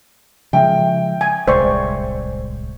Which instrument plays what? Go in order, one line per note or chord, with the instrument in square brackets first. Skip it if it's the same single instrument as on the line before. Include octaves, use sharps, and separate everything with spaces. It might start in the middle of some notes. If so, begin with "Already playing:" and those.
[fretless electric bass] C#3 F3 G#3 [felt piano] E5 G5
[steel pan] G#5
[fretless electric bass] D1 C2 G#3 [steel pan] C5 D5 C#6